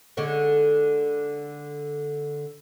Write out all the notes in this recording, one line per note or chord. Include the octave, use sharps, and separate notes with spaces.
D3 G#3 C#4